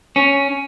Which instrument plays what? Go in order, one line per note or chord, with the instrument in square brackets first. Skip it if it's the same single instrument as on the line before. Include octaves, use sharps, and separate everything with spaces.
[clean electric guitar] C#4